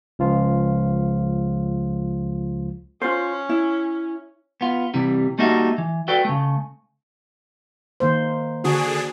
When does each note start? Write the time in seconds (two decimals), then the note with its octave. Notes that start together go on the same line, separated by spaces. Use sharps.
0.19 C#2 F3 F4
3.02 C#4 F4 C5
3.49 E4
4.61 B3 F4
4.94 C3 E3 G3
5.38 G3 A3 A#3 D#4 F#4 E5
5.78 E3
6.08 F#4 A4 B4 D5 G5
6.25 C#3 A3
8.00 D#3 A#3 C5
8.64 D3 D4 F#4 G#4